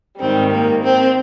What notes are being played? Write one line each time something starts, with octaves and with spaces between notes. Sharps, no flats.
G#2 D#3 G3 C4
A#3
C4